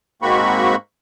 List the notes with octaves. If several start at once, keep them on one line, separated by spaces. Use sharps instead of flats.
G#2 A#3 C4 F#4 B5 C#6